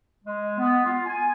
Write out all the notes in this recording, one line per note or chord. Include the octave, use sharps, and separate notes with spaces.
G#3
B3
F4
G#5